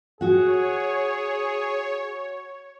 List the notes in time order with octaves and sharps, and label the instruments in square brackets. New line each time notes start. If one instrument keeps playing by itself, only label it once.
[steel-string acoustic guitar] F#4 F#5 [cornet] G#4 [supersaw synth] C#5